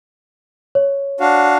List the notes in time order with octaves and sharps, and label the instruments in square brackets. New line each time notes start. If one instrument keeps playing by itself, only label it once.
[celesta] C#5
[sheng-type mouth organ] D4 F#4 F5